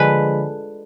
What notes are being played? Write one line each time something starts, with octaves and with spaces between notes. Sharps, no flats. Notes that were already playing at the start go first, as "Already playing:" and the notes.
Already playing: D3 F3 G#3 B4 B5